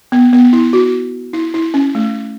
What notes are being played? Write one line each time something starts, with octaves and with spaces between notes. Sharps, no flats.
B3
B3
E4
F#4
E4
E4
C#4
A3